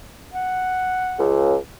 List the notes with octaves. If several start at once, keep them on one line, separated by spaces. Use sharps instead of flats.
F#5
C#2 C#3